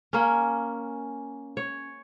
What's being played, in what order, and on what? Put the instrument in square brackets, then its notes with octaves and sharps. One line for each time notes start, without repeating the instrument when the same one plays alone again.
[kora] A#3 C#4
C#5